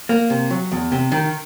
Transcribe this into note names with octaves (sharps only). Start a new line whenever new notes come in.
A#3
C3
F#3
E2
C3
D#3